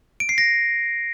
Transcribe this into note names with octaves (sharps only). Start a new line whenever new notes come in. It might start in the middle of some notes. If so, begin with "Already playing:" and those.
D7
C7
A#6